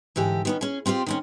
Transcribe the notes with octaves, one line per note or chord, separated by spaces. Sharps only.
G#2 D3 E3 G4
D#3 B3 C#4
C#4 G#4
C4 F4 G4 D5
D#3 C4 C#4